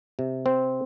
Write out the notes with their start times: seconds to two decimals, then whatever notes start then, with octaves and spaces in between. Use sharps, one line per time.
0.19 C3
0.46 C4